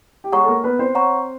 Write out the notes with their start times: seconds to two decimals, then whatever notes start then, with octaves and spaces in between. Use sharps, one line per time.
0.24 G4
0.32 G#3 G#4 C#5 F#5 A#5 C#6
0.44 A4
0.48 A#3 A#4
0.64 B3 B4
0.79 C4 C5
0.95 C#5 F#5 A#5 C#6